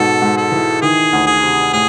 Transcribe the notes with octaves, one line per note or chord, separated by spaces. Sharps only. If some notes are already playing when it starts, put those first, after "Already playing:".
Already playing: G#2 B2 A4
G#2
A4
E3
D#3 G#4
D2
G#4
C3
A2 G#4